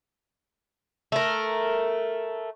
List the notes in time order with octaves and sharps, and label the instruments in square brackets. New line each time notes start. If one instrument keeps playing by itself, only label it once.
[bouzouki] A3 A#4